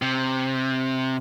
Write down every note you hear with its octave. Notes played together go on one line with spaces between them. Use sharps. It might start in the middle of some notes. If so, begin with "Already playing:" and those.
C3